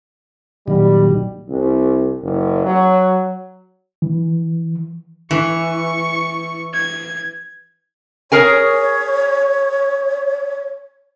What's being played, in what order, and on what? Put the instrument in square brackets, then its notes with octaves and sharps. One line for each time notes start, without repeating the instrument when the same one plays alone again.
[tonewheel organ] A#2 D#3 F#3 [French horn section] G3
[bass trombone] C2
F#1
F#3
[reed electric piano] E3
[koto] E3 [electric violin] C#6
[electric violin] G#6
[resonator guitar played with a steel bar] G#4 A#4 G#5 [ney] C#5